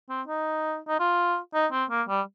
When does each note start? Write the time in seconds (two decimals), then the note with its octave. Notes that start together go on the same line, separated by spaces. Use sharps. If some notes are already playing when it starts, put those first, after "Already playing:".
0.10 C4
0.28 D#4
0.88 D#4
1.00 F4
1.54 D#4
1.72 C4
1.90 A#3
2.09 G3